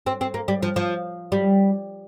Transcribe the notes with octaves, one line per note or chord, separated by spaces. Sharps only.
C4
C4
A#3
G3
F3
F3
G3